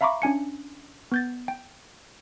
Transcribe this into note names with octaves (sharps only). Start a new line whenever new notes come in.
E5 F5 A#5 B5 C#6 D6
C#4 D4 G#5 C#7
B3 G6 A6
G5